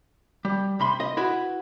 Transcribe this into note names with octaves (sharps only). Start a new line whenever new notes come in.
G3
C3 B5 C6
D#5
E4 F#4 B4